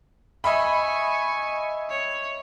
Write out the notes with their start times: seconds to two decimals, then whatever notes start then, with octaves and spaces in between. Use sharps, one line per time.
0.44 D#5 E5 G#5 B5 C#6
1.90 C#5